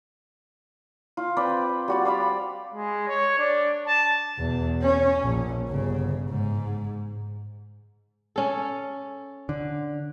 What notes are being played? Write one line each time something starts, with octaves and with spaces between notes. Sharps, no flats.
F4
C4 B4 D5 G5
G3 F#4 D5
C5 D5 F5 B5
G#3
C#5
D4
A5
E2 B2
C#4
A#1
G1 C#3
G#2
C#4 A4
D3